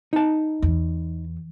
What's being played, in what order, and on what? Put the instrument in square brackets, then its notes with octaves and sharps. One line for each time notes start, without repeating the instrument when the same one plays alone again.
[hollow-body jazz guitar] D#4 A5
[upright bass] E2